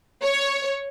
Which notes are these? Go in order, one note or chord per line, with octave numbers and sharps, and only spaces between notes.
C#5